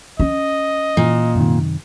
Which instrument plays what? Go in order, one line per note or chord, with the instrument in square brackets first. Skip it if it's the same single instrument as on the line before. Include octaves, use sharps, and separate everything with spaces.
[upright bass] C#4 [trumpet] D#5
[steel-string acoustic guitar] A#2 [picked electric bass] E3
[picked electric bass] F#2 C3 D#3